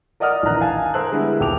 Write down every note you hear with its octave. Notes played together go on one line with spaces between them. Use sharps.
A#4 D5 D#5 F#5 D#6 F6
A#1 D#3 E3 A#5 F#6
F5 G#5 A5
A#4 C5 E6 F#6
D3 G3 G#3 B3 E4
D#1 B1 G5 D6 F7